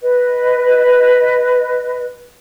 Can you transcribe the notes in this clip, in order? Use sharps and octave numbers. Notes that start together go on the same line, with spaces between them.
B4 D#5